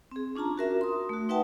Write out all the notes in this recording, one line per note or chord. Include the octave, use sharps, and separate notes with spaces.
C4 G#4
C#4 D4 F4 A5 A#5
F#4 A#4 E5
C6 D#6
A3 F#4
D#4 B4 E5 F#5 G5 A5